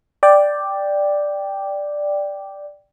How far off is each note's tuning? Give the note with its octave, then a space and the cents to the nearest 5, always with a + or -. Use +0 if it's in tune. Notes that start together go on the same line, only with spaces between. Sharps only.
D5 +0 G5 +0